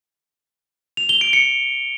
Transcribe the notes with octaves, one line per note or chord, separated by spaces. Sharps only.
F7
G7
D7
C#7